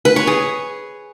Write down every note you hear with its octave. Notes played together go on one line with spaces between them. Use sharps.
B4
C#5
G#4